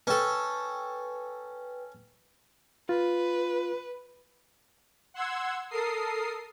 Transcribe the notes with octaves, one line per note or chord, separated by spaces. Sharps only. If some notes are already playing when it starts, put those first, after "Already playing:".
C#4 A4 B4 G5
F4 B4
F#5 C6 E6 G#6
A4 A#4 D#6 C7